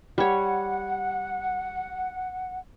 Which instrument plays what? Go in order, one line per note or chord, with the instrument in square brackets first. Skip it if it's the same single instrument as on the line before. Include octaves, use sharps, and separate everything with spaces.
[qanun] G3 C#5 [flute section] F#5